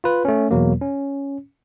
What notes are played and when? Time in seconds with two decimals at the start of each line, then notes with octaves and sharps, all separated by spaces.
0.04 F4 B4
0.25 A3 C#4
0.51 E2 B2 F#3 A#3
0.81 C#4